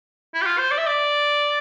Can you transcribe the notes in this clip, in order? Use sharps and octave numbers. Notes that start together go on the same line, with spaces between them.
E4
G4
F4
C5
D5
E5
D5